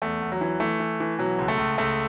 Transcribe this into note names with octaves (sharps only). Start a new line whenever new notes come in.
E2 A3
E2
F#3
E3
E3 A3
E3
E3
B2 F#3
C#2
A3
C#2
C#2 A3